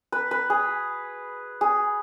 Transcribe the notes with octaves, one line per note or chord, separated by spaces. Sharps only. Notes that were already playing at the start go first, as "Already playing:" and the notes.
B4
B4
G#4
G#4